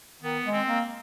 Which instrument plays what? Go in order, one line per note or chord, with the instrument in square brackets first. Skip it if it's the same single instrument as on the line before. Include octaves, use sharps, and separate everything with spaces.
[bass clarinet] D#3 [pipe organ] B3
[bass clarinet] G#3
[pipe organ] C4
[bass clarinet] A#3